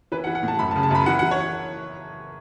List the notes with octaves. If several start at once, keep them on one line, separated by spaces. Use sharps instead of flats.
E3 B4
F#5
E3
F#5
A2
A5
F#2 B5
A5
C#3
A5
F#2 B5
E3 F#5
F#5
E3
C#5